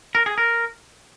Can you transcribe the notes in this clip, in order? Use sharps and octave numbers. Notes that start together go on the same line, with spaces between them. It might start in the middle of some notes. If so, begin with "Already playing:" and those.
A#4
G#4
A#4